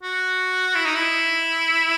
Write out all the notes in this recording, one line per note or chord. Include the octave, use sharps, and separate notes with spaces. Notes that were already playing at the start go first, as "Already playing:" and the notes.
F#4
E4
D#4
E4